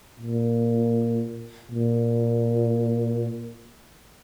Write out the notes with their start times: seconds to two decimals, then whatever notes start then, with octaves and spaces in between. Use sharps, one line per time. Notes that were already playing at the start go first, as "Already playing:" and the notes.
0.20 A#2
1.71 A#2